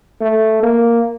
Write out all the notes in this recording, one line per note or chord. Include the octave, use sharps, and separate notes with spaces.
A3
A#3